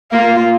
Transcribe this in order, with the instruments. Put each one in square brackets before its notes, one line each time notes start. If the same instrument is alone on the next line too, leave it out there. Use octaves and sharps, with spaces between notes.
[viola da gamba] A#3 [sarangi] F4